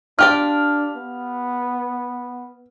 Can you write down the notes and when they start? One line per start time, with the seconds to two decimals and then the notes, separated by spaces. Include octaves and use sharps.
0.19 D4 F4 G4 D5 F6
0.96 B3